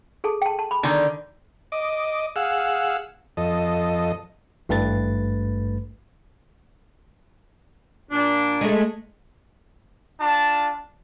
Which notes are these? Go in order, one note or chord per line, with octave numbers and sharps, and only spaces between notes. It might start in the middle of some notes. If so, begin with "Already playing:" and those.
G#4 A4 A5
G5 A5
A5
B5 D6
D3 D#3
D#5 D6
G#4 F5 F#5 E6
F2 A4 D#5
G#1 G2 A3 B4 A6
A#2 D4
G#3 A3
D4 F4 A5